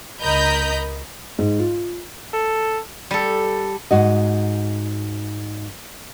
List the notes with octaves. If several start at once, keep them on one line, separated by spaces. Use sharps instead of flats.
C#2 A#4 D#5 A#5 B5 G6
G#2
F4
A4
G3 A4
G#2 F#4 D#5